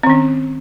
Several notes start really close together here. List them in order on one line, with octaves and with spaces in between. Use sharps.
C4 D#3 C#4